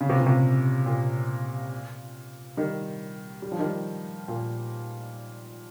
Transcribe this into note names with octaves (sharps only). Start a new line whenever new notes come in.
C#3
C3
A#2
C3
A#2
D#3 G3
G3
F3
D#3 G3
A#2